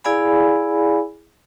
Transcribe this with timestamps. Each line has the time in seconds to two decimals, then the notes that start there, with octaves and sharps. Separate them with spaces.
0.04 E4 G#4 D5 F5 G#5 B5